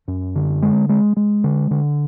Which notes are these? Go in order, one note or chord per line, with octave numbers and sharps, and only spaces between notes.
F#2
D3
G#3
G#3
G#3
D3
D3